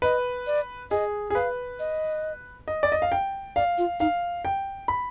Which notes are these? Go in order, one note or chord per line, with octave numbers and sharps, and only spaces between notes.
B4 D#5
D5
G#4 D#5
G#4
B4 F5
D#5
D#5
D5
D#5
F5
G5
D5 F5
F4
D#4 F5
G5
B5